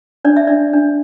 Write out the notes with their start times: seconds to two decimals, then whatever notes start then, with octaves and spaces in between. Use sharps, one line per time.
0.25 D4 D5
0.36 E5
0.47 D4 D5
0.73 D4